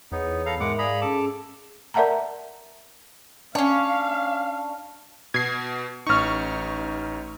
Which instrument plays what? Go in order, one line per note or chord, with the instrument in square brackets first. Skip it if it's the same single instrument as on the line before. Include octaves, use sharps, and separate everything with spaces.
[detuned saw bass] E2 [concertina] B3 D#4 [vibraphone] G#4 C#5
[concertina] A4 F5 A#5 [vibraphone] B5
[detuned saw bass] G#2 [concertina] G#3 F#5 D6 [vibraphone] A#4 E5
[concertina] G#4 A#5 B5 [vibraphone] D5 F5
[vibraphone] C#4 G#4 [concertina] A4 A5 D6
[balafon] A#4 D5 E5 F#5 A5 A#5
[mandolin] C#4 C#5 [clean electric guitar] D4 [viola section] F5
[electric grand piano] B2 [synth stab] G#6 C7
[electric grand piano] A1 D#4 [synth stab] C#6 F6